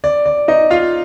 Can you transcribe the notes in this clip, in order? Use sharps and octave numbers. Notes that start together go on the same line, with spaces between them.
D5
D5
D#4 D#5
F4 F5